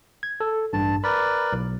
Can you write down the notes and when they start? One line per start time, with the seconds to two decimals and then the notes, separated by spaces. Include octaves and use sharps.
0.23 G#6
0.40 A4
0.73 A1 G2 A5
1.04 A#4 B4 D5 B5
1.53 B1